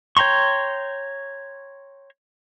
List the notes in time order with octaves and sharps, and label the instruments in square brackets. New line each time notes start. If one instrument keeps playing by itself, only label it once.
[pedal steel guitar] C#5 G5 A#5 C6 C#6